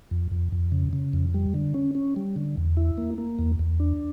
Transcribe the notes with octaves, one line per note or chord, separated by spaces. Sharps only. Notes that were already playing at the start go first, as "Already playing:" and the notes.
F2
F2
F2
C#3
C#3
F2
G3
D3
C#4
C#4
G3
D3
E2
E4
A#3
A#3
E2
E2
D4